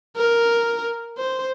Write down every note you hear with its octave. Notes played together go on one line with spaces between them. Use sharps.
A#4
C5